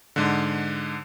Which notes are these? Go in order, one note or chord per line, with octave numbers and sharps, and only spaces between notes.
G#2 D3